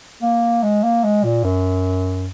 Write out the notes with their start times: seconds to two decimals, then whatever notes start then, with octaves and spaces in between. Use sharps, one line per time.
0.22 A#3
0.63 G#3
0.83 A#3
1.04 G#3
1.24 A#2
1.44 F#2